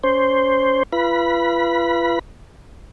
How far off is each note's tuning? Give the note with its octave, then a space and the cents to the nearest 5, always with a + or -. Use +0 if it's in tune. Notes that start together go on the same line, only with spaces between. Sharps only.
C#4 +20 C5 +0
F4 -40 B4 -5 B5 -30